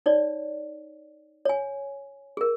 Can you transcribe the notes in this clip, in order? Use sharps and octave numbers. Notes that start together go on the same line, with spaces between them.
D#4 C#5 D5
C#5 G#5
G#4 A#4